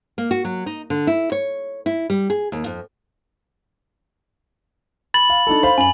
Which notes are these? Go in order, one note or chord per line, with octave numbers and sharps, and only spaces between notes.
A#3
F#4
F#3
D#4
D3
E4
C#5
E4
G3
G#4
D#2
F2
B5 A6 F#7
F5
D4 D#4 A4
C5 F5 B5
F#2 G#5 F#7